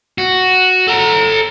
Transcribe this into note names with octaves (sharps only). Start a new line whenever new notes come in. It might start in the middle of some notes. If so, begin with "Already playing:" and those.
F#4
A4 A#5